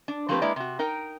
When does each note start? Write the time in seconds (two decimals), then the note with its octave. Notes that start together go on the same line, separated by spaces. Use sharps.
0.08 D4
0.29 F3 A3 A#3 C4 G4 B4
0.42 G#3 A#3 D4 E4 B4 D5
0.56 C3 F#4
0.79 D#4 A#4 G5